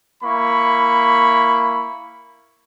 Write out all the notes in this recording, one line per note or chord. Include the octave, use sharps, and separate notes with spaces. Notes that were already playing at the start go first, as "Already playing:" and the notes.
A#3 E4 B5 C#6